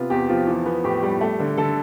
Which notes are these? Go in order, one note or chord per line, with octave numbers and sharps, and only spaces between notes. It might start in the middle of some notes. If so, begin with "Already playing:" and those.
Already playing: C3 B3 F4
E2 G4
F3 F4
E3
B3
A2 G4
G3
A3
D3
D3 A4